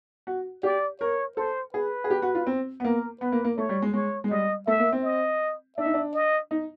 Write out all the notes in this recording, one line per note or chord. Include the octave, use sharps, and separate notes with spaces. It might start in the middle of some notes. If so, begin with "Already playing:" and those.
F#4
G4 D5
A#4 C#5
A4 C5
G#4 B4
G#4
G4
F#4
F4
C4
B3
A#3 A#4
B3 B4
A#3
A#3
A3 C#5
G3
G#3
G#3 C#5
G#3
G3 D#5
A3 E5
A#3
C4
D#5
D4 E5
D#4
D4
D#5
D#4